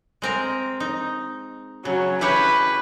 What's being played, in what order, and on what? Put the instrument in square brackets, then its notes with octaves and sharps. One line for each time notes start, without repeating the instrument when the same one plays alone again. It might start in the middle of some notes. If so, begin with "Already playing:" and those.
[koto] G#3 C4 A#4
D#4
[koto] C#3 [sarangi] F#3
[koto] E4 G4 C#5 [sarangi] B4